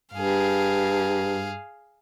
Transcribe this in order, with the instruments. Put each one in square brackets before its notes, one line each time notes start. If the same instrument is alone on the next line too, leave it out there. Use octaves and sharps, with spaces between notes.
[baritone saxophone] G2 [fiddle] G#4 F5